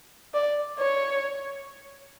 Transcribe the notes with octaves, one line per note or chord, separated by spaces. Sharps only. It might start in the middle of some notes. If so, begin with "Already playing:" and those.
D5
C#5